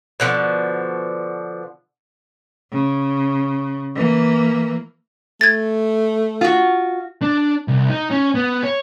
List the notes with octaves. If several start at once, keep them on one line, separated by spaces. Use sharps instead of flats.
B2 D3 F3
C#3
E3 A#3
A3 G#6 A6
F4 F#4
D4
C2
D#4
C#4
B3
C#5